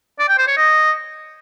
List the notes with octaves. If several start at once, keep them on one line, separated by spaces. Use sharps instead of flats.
D5
G5
C5
C#5
D#5